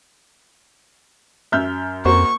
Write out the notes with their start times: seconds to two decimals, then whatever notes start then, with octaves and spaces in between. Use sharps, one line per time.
1.52 F#2 E5 F6 G6
2.05 F2 A#3 F#4 C5 C#6